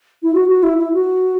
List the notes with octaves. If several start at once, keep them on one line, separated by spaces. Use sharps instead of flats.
E4
F#4
F#4
E4
E4
F#4